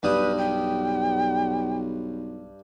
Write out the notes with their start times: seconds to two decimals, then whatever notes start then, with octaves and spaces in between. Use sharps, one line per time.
0.03 B1 G2 G3 B4 D#6
0.38 G5